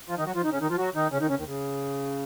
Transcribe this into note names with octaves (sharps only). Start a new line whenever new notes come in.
F3 F4
D#3 D#4
F#3 F#4
F3 F4
D#3 D#4
C#3 C#4
D#3 D#4
F3 F4
F#3 F#4
D#3 D#4
C#3 C#4
D#3 D#4
C#3 C#4
D#2 D#3
C#3